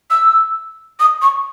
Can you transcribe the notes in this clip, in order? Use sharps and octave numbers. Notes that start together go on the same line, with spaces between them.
E6
D#6
C#6